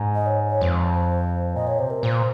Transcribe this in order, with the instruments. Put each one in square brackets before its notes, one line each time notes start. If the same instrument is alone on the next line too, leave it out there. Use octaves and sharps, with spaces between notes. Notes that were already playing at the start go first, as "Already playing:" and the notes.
Already playing: [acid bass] G#2
[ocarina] D#5
C#5
C#5
[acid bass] F2 [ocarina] C5
[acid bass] A#2 [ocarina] D#5
[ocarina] C#5
[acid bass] C3 [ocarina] C5
[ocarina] A#4
[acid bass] A#2 [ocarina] C5